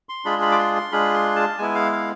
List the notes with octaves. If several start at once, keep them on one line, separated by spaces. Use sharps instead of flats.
C6
G#3 D4 F4 G#4 B5
B5
D6
C6
C6
G#3 D4 F4 G#4 B5
C6
A5
G#3 B3 E4 G#5
F5
F5